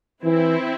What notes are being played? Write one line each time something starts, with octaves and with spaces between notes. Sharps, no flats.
E3 C4 E4